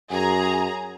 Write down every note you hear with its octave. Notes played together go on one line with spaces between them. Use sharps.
F#2 G#4 A#5